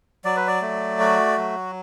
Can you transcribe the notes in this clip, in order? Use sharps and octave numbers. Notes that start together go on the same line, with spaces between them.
F#3 D5
B4
D5
A3
F#4
F#3